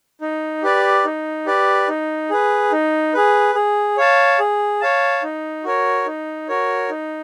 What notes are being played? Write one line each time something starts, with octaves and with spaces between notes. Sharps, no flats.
D#4
G4 B4 D5
D#4
G4 B4 D5
D#4
G#4 B4
D#4
G#4 B4
G#4
C#5 F5 A5
G#4
C#5 F5 A5
D#4
F#4 A#4 C#5
D#4
F#4 A#4 C#5
D#4